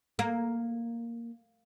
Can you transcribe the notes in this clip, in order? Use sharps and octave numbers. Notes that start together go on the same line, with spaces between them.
A#3